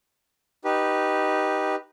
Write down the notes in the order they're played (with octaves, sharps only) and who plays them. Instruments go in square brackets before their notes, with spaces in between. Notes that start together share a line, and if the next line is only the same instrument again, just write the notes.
[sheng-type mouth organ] D#4 G4 B4